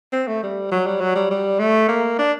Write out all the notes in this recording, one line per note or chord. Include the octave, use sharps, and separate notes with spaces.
C4
A3
G3
F#3
G3
F#3
G3
G3
A3
A#3
D4